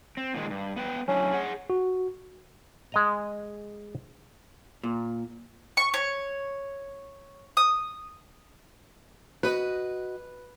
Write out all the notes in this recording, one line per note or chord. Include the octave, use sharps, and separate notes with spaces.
C4
A#2 D#3 G#3
G2
B3 B4 G5
F#3 C#4 D4 E4
G#4 F#5
F#4
G#3 D#5 A#5
A#2
C#6
C#5
D#6
F#4 B4 D#5